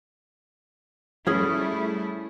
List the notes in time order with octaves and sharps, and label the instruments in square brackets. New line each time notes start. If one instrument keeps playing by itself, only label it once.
[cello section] G3 A3 E4 [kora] C#4 G#4